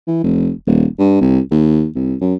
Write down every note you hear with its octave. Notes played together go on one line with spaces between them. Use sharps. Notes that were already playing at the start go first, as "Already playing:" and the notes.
E3
F1
D#1
G2
C2
D#2
C2
F#2